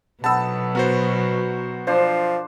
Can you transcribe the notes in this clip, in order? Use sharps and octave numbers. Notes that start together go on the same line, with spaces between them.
B2 F#3 B3 D#4 A4 A5 E6
B3 F#4 A#4 C5
F3 D4 C5